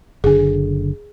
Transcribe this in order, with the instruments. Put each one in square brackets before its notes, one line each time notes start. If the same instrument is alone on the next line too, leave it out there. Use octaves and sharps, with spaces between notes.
[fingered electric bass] F#1 D3 [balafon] G#4 G#5